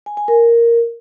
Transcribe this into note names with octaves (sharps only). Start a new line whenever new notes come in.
G#5
G#5
A#4